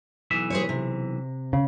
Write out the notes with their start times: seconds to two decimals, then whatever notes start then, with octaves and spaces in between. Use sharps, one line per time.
0.31 B1 E3 E5
0.50 G#4 C5 C#5
0.69 C3
1.53 C#3